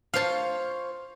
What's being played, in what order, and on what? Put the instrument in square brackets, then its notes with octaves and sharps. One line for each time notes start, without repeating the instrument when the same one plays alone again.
[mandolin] F4 C5 C#5 [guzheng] F5 A5